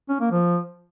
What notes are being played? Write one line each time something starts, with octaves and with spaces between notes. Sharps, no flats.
C#4
A#3
F3